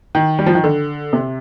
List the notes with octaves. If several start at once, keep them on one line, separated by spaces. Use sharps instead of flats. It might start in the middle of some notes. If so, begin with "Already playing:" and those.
D#3
G3
F3
D#3
D3
C3